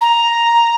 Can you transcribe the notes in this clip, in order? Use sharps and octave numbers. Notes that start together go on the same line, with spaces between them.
A#5